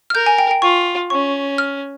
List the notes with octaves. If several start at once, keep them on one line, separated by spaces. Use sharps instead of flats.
F6
A#4 G6
G#5
G5
G5
F4 C#6
C#4 C#6
F6